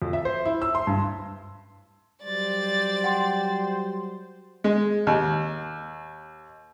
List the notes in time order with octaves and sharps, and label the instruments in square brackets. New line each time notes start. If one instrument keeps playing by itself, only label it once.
[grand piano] F2
E5
C5
E4
E6
C6
G2
[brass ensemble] F#3 G3 C5 [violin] D5 A6
[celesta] F#5 G5 C6
[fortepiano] G#3
D#2